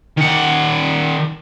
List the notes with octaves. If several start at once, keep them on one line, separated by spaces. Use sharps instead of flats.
D#3 F#5